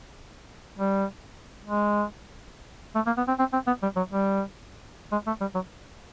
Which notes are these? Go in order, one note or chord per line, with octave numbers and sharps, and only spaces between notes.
G3
G#3
A3
A#3
B3
C4
C4
C4
B3
G3
F#3
G3
G#3
A3
G3
F#3